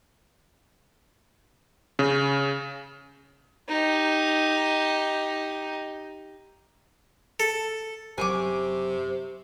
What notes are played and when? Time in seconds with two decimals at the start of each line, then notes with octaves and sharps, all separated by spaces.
1.99 C#3
3.68 D#4 G4
7.40 A4
8.18 F#1 C3 F#3 G#5 C#6 D6